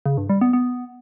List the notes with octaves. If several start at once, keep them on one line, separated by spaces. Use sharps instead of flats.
C#3
G2
G3
B3
B3